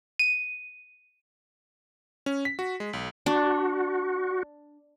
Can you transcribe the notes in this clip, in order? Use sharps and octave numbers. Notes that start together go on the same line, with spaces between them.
D#7
C#4
B6
F#4
G#3
B1
D4 F#4